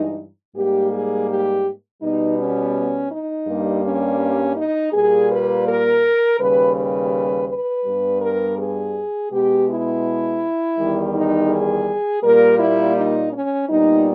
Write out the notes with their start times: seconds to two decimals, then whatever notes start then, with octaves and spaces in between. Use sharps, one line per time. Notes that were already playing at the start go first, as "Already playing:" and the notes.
Already playing: G2 E3 G#3 D#4
0.55 G#2 G3 A#3 G4
0.92 G#4
1.29 G4
2.01 B2 G3 B3 D#4
2.38 C#4
3.11 D#4
3.47 G2 G3 A#3
3.84 C#4
4.57 D#4
4.93 A#2 G3 A#3 G#4
5.30 B4
5.67 A#4
6.39 D#2 C#3 G3 B4
6.75 B4
7.48 B4
7.85 G2 G3 B3
8.21 A#4
8.58 G#4
9.31 B2 G#3 B3 G4
9.68 E4
10.78 E2 D#3 G3
11.14 D#4
11.50 G#4
12.22 A#2 G3 A#3 A#4
12.59 E4
12.95 D#4
13.32 C#4
13.68 A#2 G3 B3 D#4